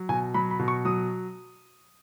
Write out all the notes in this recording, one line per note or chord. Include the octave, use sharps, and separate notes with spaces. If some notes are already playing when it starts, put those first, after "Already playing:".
Already playing: F#3
B2 G#5
F#3 B5
B5
B2
C#6
F#3 D#6